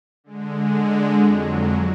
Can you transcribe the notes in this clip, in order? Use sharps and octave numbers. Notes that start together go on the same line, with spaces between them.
D3 G#3
F2 F#3